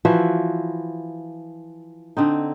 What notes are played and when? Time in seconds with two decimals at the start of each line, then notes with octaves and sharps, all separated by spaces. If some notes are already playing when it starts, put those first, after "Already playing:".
0.05 E3 F3 F#4 E5
2.17 D3 C4 D#4